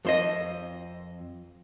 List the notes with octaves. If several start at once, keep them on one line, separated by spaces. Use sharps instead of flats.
F2 C5 D#5